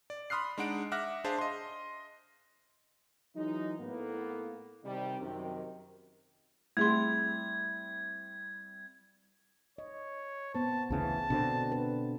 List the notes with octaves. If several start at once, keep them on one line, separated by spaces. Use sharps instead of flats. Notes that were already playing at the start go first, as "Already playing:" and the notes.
D5
B5 C6 D#6 F6 F#6 C7
G#3 D4 D#4 F#5 D7
E5 F#5 D6 F6 F#6 A#6
D4 G#4 C5 E5 F5 A5
D#5 C6
E3 F#3 G#3 D#4
A2 A#3 B3
C3 D#3 G3
F#2 C3 D#3
G3 A3 C4 E4 G#4 C6 G#6
C#5 D#5
B3 C5 A5
D2 C#3 E3 A5
B2 D3 C4 D4 F#4
B4